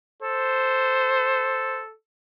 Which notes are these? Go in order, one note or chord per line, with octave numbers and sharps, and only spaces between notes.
A4 C5